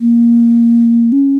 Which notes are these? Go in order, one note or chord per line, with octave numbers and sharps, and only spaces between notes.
A#3
C#4